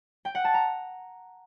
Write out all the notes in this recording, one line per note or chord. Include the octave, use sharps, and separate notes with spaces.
G5
F#5
A5
A#5